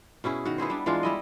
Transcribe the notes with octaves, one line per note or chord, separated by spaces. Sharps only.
B2 C#4 E4 G#4
D#3 F#4
B3 E4 G#4 C5
G3 D4
E3 G#3 D4 F4
G3 E4 D#5